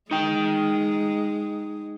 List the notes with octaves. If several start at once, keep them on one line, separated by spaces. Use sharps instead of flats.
G#3 D#4 G5